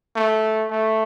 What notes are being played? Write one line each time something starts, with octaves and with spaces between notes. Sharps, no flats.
A3
A3